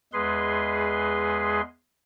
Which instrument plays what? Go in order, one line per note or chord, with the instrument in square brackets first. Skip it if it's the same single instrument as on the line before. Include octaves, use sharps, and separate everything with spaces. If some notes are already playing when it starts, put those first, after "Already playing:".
[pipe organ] E2 G#3 G#4 B4 C6